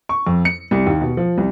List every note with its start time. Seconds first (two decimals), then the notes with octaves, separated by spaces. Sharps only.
0.09 C#6
0.27 F2
0.45 C#7
0.71 C2
0.86 D#2
1.01 B2
1.17 F3
1.38 C2